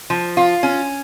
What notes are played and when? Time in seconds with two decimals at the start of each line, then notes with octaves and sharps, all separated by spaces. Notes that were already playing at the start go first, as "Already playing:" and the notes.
0.10 F3
0.37 F4
0.63 C#4